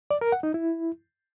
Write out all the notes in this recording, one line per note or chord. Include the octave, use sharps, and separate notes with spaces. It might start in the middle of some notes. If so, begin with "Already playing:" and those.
D5
A#4
F#5
D#4
E4